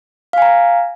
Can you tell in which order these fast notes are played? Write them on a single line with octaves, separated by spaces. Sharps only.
F5 G#5 A#5